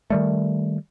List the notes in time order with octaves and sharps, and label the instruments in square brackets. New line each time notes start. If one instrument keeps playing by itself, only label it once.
[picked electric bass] D#3 G3 A3